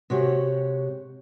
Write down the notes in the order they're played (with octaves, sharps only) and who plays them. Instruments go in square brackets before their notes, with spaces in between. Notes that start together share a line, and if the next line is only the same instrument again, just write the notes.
[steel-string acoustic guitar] C3 G#3 F#4 G4 C#5